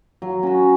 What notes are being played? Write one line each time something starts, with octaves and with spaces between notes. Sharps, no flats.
F#3
C#4 F#4